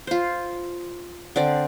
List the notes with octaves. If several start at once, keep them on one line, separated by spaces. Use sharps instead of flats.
F4 C5
D3 C4 D5